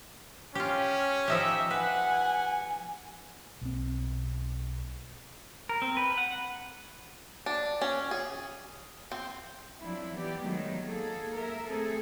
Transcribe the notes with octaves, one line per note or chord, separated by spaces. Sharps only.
C#4 F4 G4
F3 D#4 G4 E5
B4 F#5 G#5
B1 C4
A#4
C4
B4
F#5
D4
C#4
G#4
C4
F3 F#3 C4 D4 E4
E3 B3 E4 G4 D5
D#3 F#3 G#3 A3 B3 D#4
A#3 G#4 A4
A#4 E5
A3 C4 G#4 A4